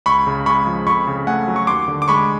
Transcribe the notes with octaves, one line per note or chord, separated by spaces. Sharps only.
C#2 B5 C#6
C#3
G#3 B5 C#6
F3
F2 B5 C#6
C#3
A3 F#5 G#5
F#3
C#6
D#2 C6 D6
D3
D6
G#3 B5 C#6